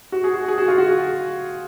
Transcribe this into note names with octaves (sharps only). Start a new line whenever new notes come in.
F#4
G#4
F#4
G#4
F#4
F4
F#4